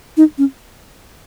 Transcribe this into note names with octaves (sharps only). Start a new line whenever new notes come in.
D#4
C#4